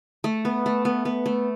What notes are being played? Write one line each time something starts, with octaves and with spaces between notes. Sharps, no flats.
A3
B3
A3
B3
B3
A3